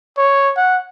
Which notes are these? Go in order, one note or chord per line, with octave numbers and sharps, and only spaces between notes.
C#5
F#5